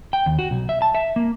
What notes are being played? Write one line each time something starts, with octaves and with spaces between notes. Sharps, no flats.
G5
D#2
F#4
B1
E5
A5
E5
A#3